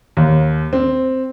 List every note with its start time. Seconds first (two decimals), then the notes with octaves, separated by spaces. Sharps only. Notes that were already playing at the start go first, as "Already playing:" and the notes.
0.17 D#2
0.73 C4